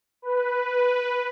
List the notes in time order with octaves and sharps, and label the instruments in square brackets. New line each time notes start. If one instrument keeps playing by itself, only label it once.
[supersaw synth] B4